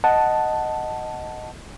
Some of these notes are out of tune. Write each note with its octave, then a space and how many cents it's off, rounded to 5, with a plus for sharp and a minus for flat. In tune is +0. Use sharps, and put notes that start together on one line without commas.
D#5 +0 F#5 +0 A5 +0